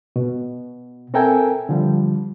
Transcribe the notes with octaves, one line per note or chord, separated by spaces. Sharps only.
B2
C4 A4 A#4 E5 G5 G#5
D3 F3 G3